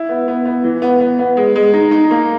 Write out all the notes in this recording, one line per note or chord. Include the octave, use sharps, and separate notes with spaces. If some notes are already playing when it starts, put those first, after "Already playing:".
Already playing: E4
B3
B3
B3
E3
B3
B3
B3
G#3
G#3
D#4
D#4
A#3